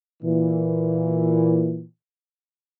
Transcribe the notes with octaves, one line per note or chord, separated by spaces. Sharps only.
A#2 E3